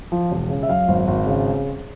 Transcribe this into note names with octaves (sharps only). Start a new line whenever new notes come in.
F3
E1
C#3
E5
F#2 F5
G#1
G#1
C#3